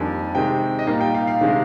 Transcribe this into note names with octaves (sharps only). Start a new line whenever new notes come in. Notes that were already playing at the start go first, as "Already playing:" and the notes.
Already playing: F2 D#3 G3 A#3 D4 G#5
C3 D#3 G#3 G5
D#5
A#2 G3 A#3 D#4 F5
G5
F5
F5
C3 D#3 G#3 D4